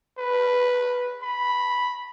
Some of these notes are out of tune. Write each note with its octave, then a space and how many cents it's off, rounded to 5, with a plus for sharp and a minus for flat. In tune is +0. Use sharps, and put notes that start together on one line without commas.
B4 +0
B5 -5